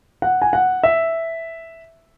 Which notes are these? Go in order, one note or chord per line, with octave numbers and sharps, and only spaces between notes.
F#5
G#5
F#5
E5